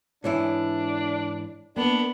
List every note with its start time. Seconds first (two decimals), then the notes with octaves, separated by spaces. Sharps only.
0.24 G#2 E3 D4 E4 C#5
1.76 A#3 B3 D4